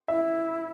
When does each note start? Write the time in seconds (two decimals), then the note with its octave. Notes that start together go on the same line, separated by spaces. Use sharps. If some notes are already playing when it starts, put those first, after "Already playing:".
0.08 E4 E5